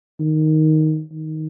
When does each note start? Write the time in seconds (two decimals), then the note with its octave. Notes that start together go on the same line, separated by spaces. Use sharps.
0.20 D#3
1.12 D#3